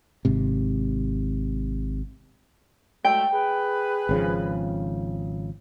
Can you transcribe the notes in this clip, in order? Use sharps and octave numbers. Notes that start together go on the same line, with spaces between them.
G#1 G#2 C3
F#3 G#3 A3 G5
G#4 B4
G#1 C#3 F3